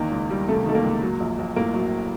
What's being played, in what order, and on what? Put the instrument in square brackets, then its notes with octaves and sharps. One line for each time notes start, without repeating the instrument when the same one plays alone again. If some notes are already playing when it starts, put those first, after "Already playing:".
Already playing: [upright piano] E2 D#3 A#3
C#2
G3
C3 A3
D#3 A3
A#3
C#2
F#3
A#1
A#1
A2 A#3
F#3